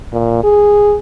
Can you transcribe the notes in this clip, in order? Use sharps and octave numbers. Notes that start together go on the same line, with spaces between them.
A#2
G#4